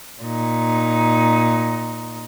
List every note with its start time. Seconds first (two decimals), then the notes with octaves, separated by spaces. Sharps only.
0.22 A#2 D#4